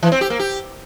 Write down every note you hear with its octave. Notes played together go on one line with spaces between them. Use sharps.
E3
C4
G4
A#3
G4